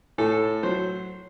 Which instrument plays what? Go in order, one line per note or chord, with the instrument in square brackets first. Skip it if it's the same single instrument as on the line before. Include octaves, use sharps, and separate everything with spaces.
[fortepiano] A2 A4
F#3 C5